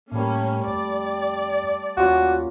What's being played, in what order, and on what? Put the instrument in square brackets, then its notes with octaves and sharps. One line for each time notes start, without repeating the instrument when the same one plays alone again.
[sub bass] A2 [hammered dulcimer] G3 A3 [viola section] A#3 C#4
[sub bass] F2 [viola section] D5
[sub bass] D#2 [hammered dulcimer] A#3 C#4 F4 [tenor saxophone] F#4